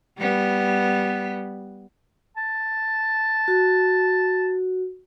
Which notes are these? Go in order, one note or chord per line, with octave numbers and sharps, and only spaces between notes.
G3 B3
A5
F#4